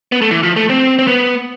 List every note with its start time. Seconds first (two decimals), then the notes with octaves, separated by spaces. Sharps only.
0.12 B3
0.22 A3
0.31 E3
0.43 F3
0.56 A3
0.70 C4
0.99 C4
1.07 B3